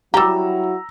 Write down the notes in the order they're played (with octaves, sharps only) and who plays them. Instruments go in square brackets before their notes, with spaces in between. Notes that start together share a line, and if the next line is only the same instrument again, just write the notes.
[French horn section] F#3 E4 F#4 [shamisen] G3 G4 [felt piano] A#5 E6